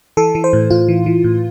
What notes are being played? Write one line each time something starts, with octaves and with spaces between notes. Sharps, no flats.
E3 A4
E3
C5
A2
A2 F4
E3
E3
A2